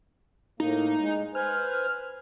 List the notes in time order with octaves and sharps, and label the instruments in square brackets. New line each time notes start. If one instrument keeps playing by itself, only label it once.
[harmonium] A2 A#3 [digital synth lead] D#4
[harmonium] G#3
[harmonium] B4 C5 G#5 [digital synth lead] F6